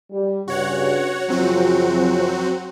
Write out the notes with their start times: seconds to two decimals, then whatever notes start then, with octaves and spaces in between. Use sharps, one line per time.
0.11 G3
0.48 G2 C#3 F#4 C#5 F#5
1.29 F#2 C#3 F3 F#3 C4 F#4